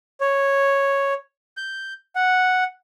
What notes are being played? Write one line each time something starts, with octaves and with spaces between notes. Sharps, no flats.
C#5
G6
F#5